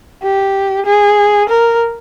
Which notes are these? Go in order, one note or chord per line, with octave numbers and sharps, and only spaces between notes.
G4
G#4
A#4